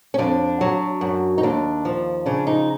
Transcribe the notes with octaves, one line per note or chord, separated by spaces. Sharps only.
C#4
F2 D4
F#3
F#2
D#4
D#2 D4
F3
C#3 D4
D#4